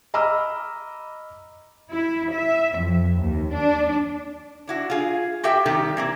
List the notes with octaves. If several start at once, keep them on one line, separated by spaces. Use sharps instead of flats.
D#5 A#5 B5 D6 E6 F6
E4
E5
F2
D#2
D4
D4 E4 F#4
F4 G#4
F#4 G4 A4 E5 G5
C3 D#3 G3 G4 A4
E3 A#3 C4